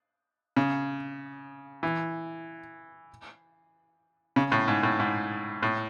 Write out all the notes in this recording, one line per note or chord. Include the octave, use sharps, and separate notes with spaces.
C#3
E3
C#3
A2
G#2
A2
G#2
A2